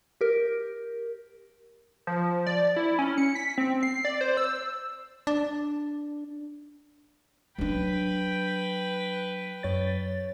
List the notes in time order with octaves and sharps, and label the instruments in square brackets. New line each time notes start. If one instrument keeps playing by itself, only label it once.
[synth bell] G4 A#4
[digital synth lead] F3
D5
E4
C#4
C#7
B6
C4
C7
D5
C5
E6
[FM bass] D4
[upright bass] F#3 D4 [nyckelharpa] B4 G5
[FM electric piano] F#2 C#5 A6